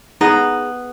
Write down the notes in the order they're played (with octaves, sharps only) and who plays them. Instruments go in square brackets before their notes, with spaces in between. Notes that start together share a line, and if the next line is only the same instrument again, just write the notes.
[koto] B3 [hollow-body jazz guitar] D#4 G#4 A#5